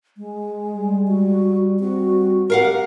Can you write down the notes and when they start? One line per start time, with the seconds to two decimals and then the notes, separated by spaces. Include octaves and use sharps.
0.17 G#3
0.74 G3
1.08 F#4
1.80 G3 C4 F#4
2.50 G4 A#4 F5 F#5